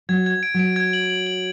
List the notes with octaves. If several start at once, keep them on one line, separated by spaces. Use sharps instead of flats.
F#3 G#6
G#6
D7
F#3 D7
G#6
F#7
F#7
F#7